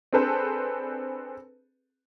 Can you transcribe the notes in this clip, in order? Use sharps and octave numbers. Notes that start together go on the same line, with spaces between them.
C4 D4 G#4 A4 B4 C5